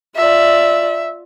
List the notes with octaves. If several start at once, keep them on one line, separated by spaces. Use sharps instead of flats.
F4 D5 E5